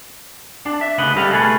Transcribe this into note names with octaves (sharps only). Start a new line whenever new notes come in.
D4
E5
D2 C#3 B4 D#5 F#5
G3 G4 A4 B4 D#5 F5
B2 A3 G#4 A4 B4